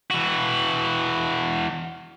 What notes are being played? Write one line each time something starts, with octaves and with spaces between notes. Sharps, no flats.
E3 F#4